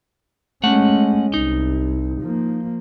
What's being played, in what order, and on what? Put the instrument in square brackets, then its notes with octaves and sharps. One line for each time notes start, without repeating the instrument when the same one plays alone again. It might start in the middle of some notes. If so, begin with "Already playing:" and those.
[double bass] G#3 C#4 [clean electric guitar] A3 F#5
[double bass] C2 [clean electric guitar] D#4
[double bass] F3 A#3